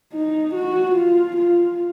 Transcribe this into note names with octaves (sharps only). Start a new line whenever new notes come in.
D#4
F#4
F4
F4